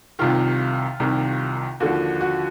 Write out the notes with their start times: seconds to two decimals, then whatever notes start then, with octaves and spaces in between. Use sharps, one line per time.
0.19 C2 C3 D#3 F4
1.00 C2 C3 D#3
1.80 D#2 D3 F3 F#4
2.21 F#4